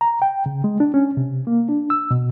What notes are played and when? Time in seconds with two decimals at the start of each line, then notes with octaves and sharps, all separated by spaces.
0.01 A#5
0.22 G5
0.46 C#3
0.64 G#3
0.80 D4
0.94 C#4
1.17 C3
1.47 A#3
1.69 D4
1.90 E6
2.11 B2